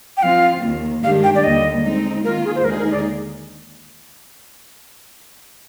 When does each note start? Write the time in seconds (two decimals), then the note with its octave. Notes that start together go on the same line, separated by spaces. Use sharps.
0.17 G5
0.23 F3 C4 F4 F5
0.63 D#2 D#3 A#3
1.03 G2 D#3 G#3 D4 G4 F5
1.24 G5
1.36 D5
1.44 D#2 D3 G3 A#3 D#5
1.85 G#3 C4 D#4
2.24 D#3 A#3 F4 A#4
2.45 G#4
2.55 C5
2.64 D#2 D3 G#3 D#4 G#4 A#4
2.79 A#4
2.91 D5